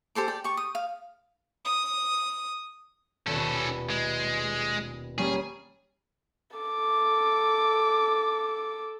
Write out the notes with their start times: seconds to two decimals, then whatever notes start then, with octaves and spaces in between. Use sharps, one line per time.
0.15 G4 A4 C5 D6
0.28 G4 D5 G5
0.44 G4 C#6
0.57 D#6
0.75 F5
1.65 D#6
3.27 D#1 B2 C#4 A4 B4
3.90 G#3
5.18 G3 A#3 C#4 G#4
6.57 A4 D6